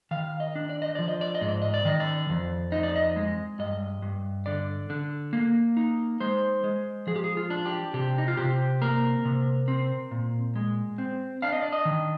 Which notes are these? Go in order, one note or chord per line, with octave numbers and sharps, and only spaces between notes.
D#3 F5
D#5
D4
D5
D#5
F3 D5
D#5
D5
D#5
G#2
D5
D#5
D5
D#3 D#5
D5
F2
D#4 D#5
D5
D#5
G#3
G2 D#5
G2
D3 D5
D3
A#3
D#4
G#3 C5
G#3
F3 G#4
G4
G#4
F4
D4
G4
C3 G4
D#4
F4
C3 G4
A#3 A#4
C3
C4
A#2
G#3
C4
D4 F5
D#5
D5
D#5
D#3